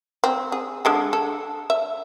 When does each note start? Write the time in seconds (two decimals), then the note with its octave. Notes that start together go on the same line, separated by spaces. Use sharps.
0.24 C4
0.52 G#4
0.85 D3 G#3 A4
1.13 A4
1.70 E5